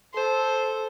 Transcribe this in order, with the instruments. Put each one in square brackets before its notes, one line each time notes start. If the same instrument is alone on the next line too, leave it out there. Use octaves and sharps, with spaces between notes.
[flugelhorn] A4 [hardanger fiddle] C5